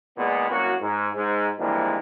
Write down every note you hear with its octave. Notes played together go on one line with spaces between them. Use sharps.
E2 A#2 G#3 B3
C2 F#2 A#3 F#4
G#2
G#2
G2 E3 F3 G3 G#3 A#3